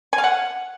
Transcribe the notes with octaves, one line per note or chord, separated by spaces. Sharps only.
G#5
F5
F#5